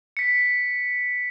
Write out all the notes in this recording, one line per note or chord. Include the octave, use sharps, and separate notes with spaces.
B6 C#7